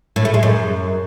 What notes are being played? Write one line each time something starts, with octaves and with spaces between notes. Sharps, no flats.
A2
A3
G#3
F#2